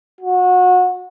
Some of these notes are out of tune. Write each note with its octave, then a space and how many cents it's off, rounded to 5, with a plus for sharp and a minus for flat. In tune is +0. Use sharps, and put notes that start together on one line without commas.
F#4 -25